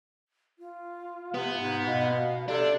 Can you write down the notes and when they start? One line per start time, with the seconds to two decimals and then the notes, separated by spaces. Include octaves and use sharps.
0.59 F4
1.34 C3 B3
1.56 G#2
1.87 B2 F5
2.48 C3 D4 A4